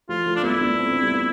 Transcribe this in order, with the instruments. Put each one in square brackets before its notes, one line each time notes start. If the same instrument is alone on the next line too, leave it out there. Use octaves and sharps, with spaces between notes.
[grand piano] F3 A3 [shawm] F4
[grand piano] F3 A3
[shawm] D4
[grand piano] G3 B3 [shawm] E4
[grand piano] B3 D4
A3 C4
C4
G3 B3
B3